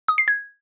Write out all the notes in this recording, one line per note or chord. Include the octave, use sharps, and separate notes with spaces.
D#6
C7
G#6